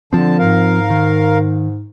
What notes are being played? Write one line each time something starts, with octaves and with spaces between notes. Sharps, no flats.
D3 F3 C4 A5
G#2 A#4 F5
D#3